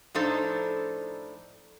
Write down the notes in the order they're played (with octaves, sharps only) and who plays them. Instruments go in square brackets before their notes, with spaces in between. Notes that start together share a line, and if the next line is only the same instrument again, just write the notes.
[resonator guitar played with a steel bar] A2 F3 D4 D#4 A4 C5